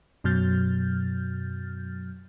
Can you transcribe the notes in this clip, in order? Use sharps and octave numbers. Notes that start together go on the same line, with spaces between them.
F#2 B2 F#3 F6 G6 A6